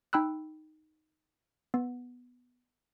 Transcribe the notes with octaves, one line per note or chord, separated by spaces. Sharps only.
D#4 G5 B5 E6 F#6
B3